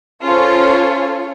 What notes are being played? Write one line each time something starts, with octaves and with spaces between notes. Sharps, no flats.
C#4 F4 G#4 A4 C5 C#5